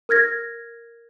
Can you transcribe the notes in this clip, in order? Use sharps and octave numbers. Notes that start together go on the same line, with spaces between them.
A#4 F6 G#6 A#6